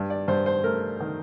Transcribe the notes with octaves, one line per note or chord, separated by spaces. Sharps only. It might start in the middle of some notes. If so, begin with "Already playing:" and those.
Already playing: G2
D5
G2 C5
C5
A3 A#4
D#3